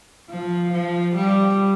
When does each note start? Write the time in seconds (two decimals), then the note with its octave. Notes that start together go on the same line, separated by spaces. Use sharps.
0.29 F3
0.73 F3
1.16 G3